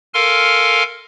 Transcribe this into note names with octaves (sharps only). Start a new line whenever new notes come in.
A4 A#4 F5 G#5 C6 F6